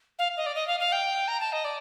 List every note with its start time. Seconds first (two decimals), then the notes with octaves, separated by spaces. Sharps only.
0.19 F5
0.37 D#5
0.46 D5
0.55 D#5
0.67 F5
0.80 F5
0.92 G5
1.28 A#5
1.40 A5
1.52 D#5
1.65 D5